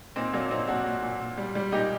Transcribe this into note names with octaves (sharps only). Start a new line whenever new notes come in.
A#2 C4 D#4
F#3 A#3 D4
A#2 C4 D#4
A#2 D4 F#4
A#2
A#2
A#2
G3
G3
A#2 D#4 G4